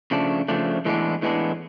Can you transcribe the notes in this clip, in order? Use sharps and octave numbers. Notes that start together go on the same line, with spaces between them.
C#3 F3 A3 D4
C#3 F3 A3 D4
A2 E3 G#3 B3 D4
A2 E3 G#3 B3 D4